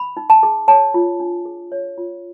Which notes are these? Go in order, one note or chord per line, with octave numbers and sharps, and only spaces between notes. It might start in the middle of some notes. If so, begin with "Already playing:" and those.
Already playing: B5
D#4
A5
G#4
C#5 A5
F4
D4
G#4
C#5
F4